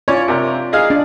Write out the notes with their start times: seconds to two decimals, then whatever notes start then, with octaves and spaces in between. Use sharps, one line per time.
0.08 C#4 F4 C#5 D5
0.28 C3 A#4
0.72 D#4 G#4 F5
0.90 D4 D5